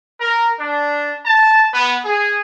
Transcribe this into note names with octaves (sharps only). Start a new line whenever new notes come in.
A#4
D4
A5
B3
G#4